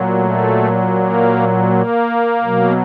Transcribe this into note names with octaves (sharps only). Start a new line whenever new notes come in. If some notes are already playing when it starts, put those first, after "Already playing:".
Already playing: A#2 F#3
A3
A#3
A#3
B2 F#3